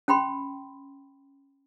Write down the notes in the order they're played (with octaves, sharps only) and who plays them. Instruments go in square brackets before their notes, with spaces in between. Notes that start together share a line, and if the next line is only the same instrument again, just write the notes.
[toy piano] C#4 G5 B5 C6